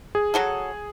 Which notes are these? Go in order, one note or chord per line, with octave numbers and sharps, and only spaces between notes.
G#4
F#3 F#4 A4